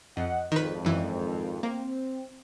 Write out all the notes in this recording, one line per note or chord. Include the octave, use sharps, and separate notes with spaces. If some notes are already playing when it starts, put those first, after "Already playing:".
F2 D#5 F#5
G#1 F2 D#3 B4
F#2 E3
A#3 C4